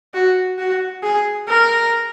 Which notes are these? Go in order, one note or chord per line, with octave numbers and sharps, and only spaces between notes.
F#4
F#4
G#4
A#4